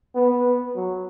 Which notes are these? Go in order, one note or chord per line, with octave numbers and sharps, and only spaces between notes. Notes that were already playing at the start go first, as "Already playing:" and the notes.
B3
F#3